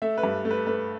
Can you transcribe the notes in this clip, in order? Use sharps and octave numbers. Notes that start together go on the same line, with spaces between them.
A3 E5
B4
G2
A3
B4
A3 B4